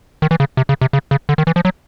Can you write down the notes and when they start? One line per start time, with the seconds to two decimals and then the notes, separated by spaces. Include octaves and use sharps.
0.22 D#3
0.31 E3
0.40 C#3
0.57 C3
0.69 C#3
0.81 C3
0.93 C#3
1.11 C#3
1.29 D3
1.38 D#3
1.47 E3
1.56 F3
1.65 F#3